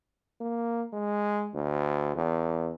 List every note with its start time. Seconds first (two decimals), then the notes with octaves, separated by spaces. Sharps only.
0.41 A#3
0.93 G#3
1.54 D2
2.16 E2